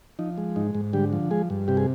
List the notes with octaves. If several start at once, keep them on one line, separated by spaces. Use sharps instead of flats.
F3 D#4
G#3
G#2 D#4
G#2
D3 G3 G4
F3
G#3 G#4
G2
C3 G4
G#4